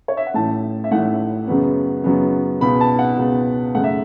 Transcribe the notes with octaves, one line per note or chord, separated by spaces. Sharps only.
C#5
E5
F#5
A1 A2 A3 A5
E5
A1 A2 A3 F#5
F#2 C#3 F#3 B3
F#2 C#3 F#3 B3
C#2 B2 B3 B5
A5
F#5
C#2 B2 B3
F#2 C#3 A3 F#5
E5